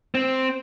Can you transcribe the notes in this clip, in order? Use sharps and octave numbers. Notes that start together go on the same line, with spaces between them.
C4